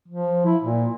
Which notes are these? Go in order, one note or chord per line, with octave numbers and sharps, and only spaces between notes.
F3
E4
A#2